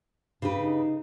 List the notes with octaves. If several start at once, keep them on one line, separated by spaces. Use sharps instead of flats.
G2 C#3 G4 B4
D#4